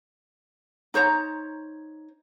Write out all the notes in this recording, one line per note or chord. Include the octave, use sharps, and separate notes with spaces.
D#4 C5 C#5 A#5